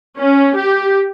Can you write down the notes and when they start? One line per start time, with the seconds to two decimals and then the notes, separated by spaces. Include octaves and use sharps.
0.20 C#4
0.56 G4